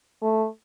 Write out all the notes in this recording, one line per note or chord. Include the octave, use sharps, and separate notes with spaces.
A3